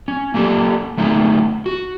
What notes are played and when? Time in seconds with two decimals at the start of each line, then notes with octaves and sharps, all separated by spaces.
0.08 C#4
0.34 A#3 C#4 G4 A4
0.97 D3 A3 C#4 D#4 G#4
1.66 F#4